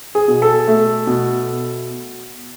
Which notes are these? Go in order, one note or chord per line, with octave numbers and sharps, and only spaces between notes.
G#4
B2
A4
A3
B2